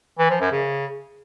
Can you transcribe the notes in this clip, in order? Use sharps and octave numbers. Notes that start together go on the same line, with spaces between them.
E3
F3
F#2
C#3